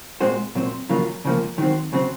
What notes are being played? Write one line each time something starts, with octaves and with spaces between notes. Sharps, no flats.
A#2 G#3 C4 F#4 C5
A#2 F#3 C4
F2 C#3 F#3 A#3 F4
C#2 C#3 F3 A#3
D#3 F#3 C4
C#3 F#3 C4